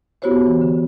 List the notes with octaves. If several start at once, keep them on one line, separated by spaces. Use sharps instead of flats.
B3 E4 F#4 G4 C5 C#5
E3
D3